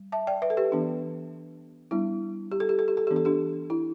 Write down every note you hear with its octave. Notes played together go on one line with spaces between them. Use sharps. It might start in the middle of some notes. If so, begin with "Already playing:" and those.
Already playing: G3
E5 A5
D5 G5
B4 E5
A4
G4 B4
E3 B3 D4
G3 B3 D4 E4
G4
A4
G4
A4
G4
A4
E3 B3 D4 G4
A4
D4 G4
E4